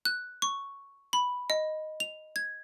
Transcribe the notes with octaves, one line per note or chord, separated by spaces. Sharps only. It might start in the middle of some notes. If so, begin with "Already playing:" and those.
F#6
C#6
B5
D#5
F7
G#6